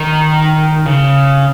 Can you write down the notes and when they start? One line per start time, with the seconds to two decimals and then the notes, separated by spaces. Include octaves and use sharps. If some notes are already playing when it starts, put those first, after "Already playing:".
Already playing: D#3
0.86 C#3